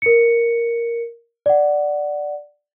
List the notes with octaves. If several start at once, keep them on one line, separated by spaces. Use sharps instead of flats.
A#4 C#7
D5 F#5